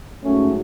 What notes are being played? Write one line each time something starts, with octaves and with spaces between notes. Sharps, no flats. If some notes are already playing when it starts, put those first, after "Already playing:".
G#2 F#3 A3 C#4